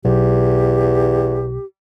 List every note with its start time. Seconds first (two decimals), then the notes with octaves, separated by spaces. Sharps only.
0.05 B1 E2 G4